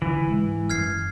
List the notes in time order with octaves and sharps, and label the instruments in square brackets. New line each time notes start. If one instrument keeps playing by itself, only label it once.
[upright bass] D3 [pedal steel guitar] E3
[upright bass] G#2 G#3
[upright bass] F#2 E4 [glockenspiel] F6 G#6 C7